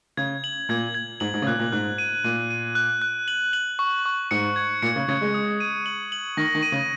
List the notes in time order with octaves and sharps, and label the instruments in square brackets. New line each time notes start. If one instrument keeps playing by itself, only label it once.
[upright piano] C#3 [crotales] G#6
[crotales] F#7
[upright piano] A#2 [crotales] G#6
[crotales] G#6
[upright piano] G#2 [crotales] F#7
[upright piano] G#2
C#3
[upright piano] A#2 [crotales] F#6
[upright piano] A#2
[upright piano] G#2 [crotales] F#6
[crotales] D#7
[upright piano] A#2 [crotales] D#7
[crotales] D#7
F#6
F#6
F#7
F#7
C#6
C#6
[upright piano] G#2 [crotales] C#7
[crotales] G#6
[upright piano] A#2 [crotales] C#7
[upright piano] C#3
[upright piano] C#3 [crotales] G#6
[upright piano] G#3
[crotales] D#6
D#7
F#7
F#7
[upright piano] D#3 [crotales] A#6
[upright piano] D#3
[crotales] D#7
[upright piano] C#3